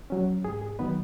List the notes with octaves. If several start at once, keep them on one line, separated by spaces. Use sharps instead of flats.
F#3 C#4
G#2 G#4
G#4
D#3 F#3 B3 D#4 B4